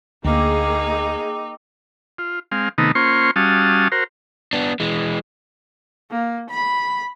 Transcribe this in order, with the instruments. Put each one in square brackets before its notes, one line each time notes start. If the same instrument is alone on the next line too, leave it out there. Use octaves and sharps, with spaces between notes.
[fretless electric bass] D2 [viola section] A#3 G#4 [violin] D#4 [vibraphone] G5 D6 E6
[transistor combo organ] F4
G#3 C4 F5
C3 D#3 A3 B3 D#4
A#3 C#4 F4 C5 C6 C#6
G3 C#4 F#4 F5 A5 D#6
F#4 A#4 C5
[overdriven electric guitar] B3 D4
E3 G#3
[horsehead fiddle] A#3
B5